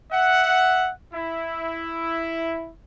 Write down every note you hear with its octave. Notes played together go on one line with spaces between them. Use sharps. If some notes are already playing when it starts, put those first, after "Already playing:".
E5 F#5
E4